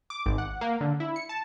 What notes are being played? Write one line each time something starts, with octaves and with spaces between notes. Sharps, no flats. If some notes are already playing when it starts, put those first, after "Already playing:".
D6
G#1
F#5
A#3
D3
E4
C#7
A5